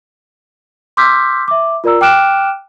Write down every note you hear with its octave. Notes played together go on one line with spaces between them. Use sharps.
C6 D6 E6 F6 G6 B6
E5 D6
F4 A#4 D5 A#5 E6
G5 D6 F6 F#6 D7 E7